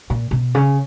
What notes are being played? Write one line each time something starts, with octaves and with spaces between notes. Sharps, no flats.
A#2
B2
C#3